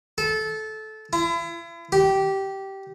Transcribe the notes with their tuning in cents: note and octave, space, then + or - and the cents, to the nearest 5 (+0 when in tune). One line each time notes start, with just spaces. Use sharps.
A4 -20
E4 +40
G4 -15